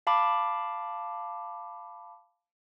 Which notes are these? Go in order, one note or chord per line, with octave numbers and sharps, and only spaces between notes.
F5 A5 B5 D6